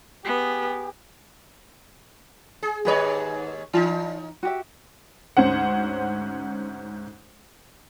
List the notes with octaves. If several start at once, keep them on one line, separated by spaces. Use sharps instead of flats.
B3 G4 G#4
G#4
D#2 G#2 G#4 B4 C#5 D#5
E3 D#4 F4 D5 A5
F#4 G4 E5
D2 G#2 C#4 C5 F#5